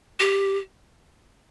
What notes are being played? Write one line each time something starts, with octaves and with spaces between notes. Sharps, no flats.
G4